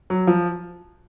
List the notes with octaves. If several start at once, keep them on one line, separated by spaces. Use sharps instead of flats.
F#3
F3